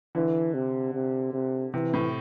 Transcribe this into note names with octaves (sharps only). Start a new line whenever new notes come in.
D3 E3
C3
C3
C3
C3 E3
A2